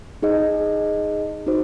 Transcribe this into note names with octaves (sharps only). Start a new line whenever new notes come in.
D#4 G#4 D#5
D#4 F#4 C5